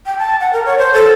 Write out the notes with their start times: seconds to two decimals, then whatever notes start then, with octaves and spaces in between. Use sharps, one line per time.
0.06 G5
0.18 A5
0.40 F#5
0.53 A#4
0.66 C#5
0.78 C5
0.94 A4